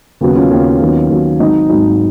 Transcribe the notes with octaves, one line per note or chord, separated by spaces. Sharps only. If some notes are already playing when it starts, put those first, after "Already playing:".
D#2 C#3 F#3 B3
C#4 F4
D#2 C#3 F#3 B3 C#4 F4
D#2 D#3 F#3 B3
D#2 D#3 F#3 B3
G#1 G#2 F#3 D#4
G#1 G#2 F#3 D#4